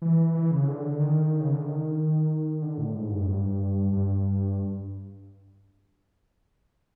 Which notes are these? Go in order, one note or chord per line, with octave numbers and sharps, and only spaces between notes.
E3
E3
C#3
D3
D#3
C#3
D3
D#3
D3
A2
G#2
G2
F#2
G2
G2